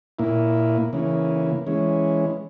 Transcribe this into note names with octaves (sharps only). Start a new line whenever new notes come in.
A#2 A#3 E4
C#3 E3 A#3
E3 G#3 C#4